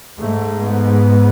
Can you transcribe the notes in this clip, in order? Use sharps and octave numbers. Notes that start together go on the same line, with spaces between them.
G#2 A3
B3